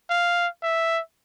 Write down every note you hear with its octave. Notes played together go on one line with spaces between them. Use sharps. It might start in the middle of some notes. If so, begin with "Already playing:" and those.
F5
E5